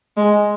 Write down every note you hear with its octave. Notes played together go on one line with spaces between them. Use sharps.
G#3